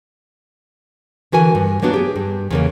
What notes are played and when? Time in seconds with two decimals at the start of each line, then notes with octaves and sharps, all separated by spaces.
1.32 D3 E3 F#4 A#4 G#5
1.55 G2
1.82 F#3 A#3 B3 D4 F#4
1.94 G4 G#4
2.16 G2
2.50 E2 C#3 A#3